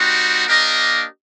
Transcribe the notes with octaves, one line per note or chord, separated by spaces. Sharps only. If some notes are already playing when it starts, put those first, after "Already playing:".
Already playing: G3 C4 D#4 F#4
A#3 D4 G4 A#4 D#5